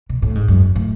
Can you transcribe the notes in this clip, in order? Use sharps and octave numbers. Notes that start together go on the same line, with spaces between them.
B2
A2
G#2
F#2
A2